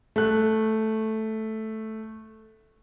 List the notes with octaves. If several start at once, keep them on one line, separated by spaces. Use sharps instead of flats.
A3 F#6